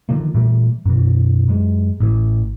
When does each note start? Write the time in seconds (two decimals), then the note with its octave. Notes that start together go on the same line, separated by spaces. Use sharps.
0.09 D3 D#3 F3 A#3
0.34 A#2 E3 G3 A3
0.86 F#2 B2 E3
1.48 F#2 G#3
2.00 A1 E3